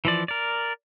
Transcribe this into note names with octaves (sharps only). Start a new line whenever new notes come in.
E3 F3 D5
A#4 D5